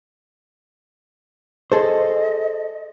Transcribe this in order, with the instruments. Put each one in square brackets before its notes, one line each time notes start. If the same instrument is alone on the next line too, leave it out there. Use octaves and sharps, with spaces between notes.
[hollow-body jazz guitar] G#4 A4 C5 [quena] D#5